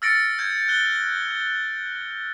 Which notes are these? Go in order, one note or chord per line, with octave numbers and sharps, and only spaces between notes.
E6 F6 A6 A#6 C#7 D7
G6 G#6
F#6 G7
G#6